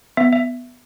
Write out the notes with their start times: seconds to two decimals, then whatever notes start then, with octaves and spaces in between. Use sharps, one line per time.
0.17 B3 E5
0.32 E5